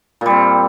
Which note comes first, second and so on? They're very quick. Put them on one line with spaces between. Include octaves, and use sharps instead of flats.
A#2 G3 C4